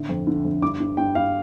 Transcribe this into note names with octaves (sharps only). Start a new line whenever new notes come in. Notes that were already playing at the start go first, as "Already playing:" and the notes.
Already playing: A2 D3
F2
D3
F2
G2 D6
G2
G2 G5
G2 F5